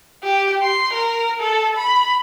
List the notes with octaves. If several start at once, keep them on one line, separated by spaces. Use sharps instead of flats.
G4
C6
A#4
A4
B5